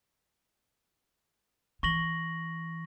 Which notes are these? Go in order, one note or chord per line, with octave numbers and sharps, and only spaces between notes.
E3 C#6 A#6 F#7